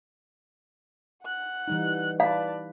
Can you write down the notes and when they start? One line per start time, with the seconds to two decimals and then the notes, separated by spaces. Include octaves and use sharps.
1.24 F#5 F#6
1.68 E3 G3 D#4
2.20 B4 D5 F5 A5